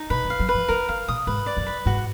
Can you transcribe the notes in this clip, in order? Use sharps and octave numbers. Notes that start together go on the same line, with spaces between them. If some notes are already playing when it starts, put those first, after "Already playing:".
Already playing: D#4
B2 B4
F#3
F5
F#3
B4
F3
D#3 A#4
D3 F5
A#2 D#6
G#2 B4
D5
F#2
B4
G#2 F#4